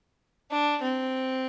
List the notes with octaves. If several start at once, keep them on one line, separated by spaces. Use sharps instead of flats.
D4
C4